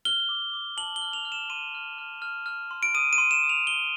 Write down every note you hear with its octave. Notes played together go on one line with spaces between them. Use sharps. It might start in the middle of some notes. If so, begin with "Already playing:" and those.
F6 G7
D6
D6
A5 F#7
G7
F6
F7
F6
E7
C6 D#7
F6
F6
F6
F6
C6
D7
D#6 D#7
D#7
C6
E7
D#6
F7
C6 G7